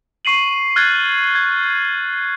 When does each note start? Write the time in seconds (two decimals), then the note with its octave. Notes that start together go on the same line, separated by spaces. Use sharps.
0.25 C#6 C7 D#7 F#7
0.76 F6 F#6 G#6 A6
1.35 G#6